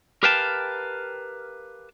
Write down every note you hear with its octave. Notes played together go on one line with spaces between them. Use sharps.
G4 A#4 B4 F5 G5 A5